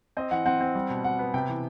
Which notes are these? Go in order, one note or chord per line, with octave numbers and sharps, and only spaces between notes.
C4 D#5
E3 F#5
C4 F#5
C4
G3
B2
B2 F#5
B3
C3 G5
E3